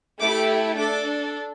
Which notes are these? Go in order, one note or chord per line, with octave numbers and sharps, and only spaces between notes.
A3 E4 G4 D6
D4 A4 D6